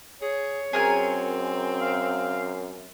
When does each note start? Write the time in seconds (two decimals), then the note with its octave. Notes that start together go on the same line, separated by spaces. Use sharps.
0.21 G#4 C#5
0.73 F#2 C4 G#4 A#4 G#5
1.81 F5